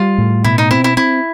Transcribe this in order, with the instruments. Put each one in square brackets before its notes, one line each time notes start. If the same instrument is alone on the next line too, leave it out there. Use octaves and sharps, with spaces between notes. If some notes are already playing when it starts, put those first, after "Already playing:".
Already playing: [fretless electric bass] G3 [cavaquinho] F4
[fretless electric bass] A2
[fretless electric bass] B2 [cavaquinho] E4
[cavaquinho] D#4
[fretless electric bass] C4 [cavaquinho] E4
[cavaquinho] E4
[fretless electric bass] C4 [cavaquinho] E4